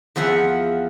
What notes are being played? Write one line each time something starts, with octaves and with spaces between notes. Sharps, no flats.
E2 F3 E5 F#5